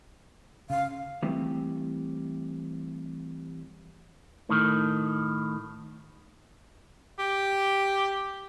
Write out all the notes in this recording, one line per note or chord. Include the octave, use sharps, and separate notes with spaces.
C#3 F5
E3 G3 A3 C4
A2 D#3
G4